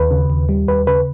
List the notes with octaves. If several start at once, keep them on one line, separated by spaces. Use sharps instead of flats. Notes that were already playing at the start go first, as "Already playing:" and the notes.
Already playing: D#2 B4
C#3
D#2
G3
D#2 B4
C#3 B4